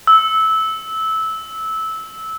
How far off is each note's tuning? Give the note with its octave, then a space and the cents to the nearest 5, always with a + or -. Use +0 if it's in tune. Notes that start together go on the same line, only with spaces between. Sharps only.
E6 -15